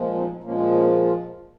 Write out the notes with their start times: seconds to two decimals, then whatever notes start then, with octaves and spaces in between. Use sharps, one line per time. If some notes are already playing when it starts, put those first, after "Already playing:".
Already playing: A#2 F3 G#3
0.14 C4 D#4
0.43 A#2 F3 G#3 A#3 C#4
0.71 A#3 C#4
1.01 F4